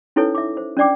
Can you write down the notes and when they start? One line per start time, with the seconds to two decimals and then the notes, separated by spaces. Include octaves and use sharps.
0.16 C#4 D#4 E4 A4 B4 C#5
0.35 E5 D6
0.57 C5
0.77 C#4 D4 D5 G5 D6